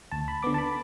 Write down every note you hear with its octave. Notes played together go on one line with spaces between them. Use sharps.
D2 A5
B5
D3 B3 D6
A5
B5